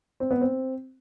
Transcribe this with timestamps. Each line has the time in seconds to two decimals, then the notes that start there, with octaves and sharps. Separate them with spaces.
0.20 C4
0.31 B3
0.41 C4